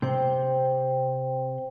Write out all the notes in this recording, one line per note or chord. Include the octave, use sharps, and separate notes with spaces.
C3 C4 C5 G5